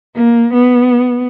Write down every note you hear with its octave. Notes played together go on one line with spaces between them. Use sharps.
A#3
B3